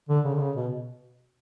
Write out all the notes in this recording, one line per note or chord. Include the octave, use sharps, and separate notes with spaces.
D3
C#3
D3
C#3
B2